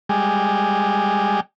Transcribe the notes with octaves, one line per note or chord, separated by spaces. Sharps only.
G3 G#3